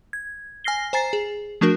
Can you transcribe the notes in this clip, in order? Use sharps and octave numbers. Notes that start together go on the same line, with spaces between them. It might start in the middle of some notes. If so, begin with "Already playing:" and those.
G#6
G#5 F6 A#6 C7 G7
C5 G#5 A#5 A6 C7
G#4
F3 A3 D4 F#4 A#4